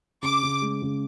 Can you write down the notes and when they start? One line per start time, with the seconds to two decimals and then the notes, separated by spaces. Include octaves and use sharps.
0.23 C#3 D6
0.43 C#3
0.62 G#3
0.82 C#3